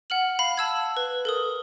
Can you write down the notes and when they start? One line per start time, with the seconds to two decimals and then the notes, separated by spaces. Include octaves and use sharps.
0.10 F#5 F6 F#7
0.39 F5 B5
0.57 A5 E6 G#6
0.97 B4
1.25 A4 A#4 D#6